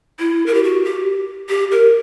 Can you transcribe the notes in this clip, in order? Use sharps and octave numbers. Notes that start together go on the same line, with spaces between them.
E4
A#4
G4
F#4
G4
G4
A#4